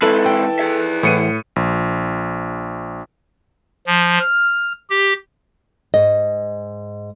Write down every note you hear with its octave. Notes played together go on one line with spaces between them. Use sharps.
G#3 C4 E4 A4 B4
G5
G#4 E5
A2 E3 C5 F#5 C#7 D#7
A#1
F3
F6
G4
G#2 D#5